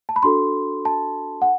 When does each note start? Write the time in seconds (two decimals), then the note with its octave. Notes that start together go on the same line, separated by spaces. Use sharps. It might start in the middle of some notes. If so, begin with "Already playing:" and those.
0.09 A5
0.16 B5
0.23 D4 F#4 A4 C6
0.85 A5
1.42 F#5